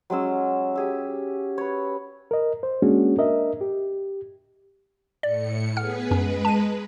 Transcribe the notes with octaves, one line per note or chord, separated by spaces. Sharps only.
F#3 G#3 C#4 E6
G4 G#4 E5
B4 C#5
A#4 D#5
C5
G#3 A#3 C#4 D4 F#4 G#4
D4 A#4 D#5 E5
G4
A2 D5 C#7
B3 G#4 B4 F#5 F6
F#2 G#3 C#4 B4
A5 D#7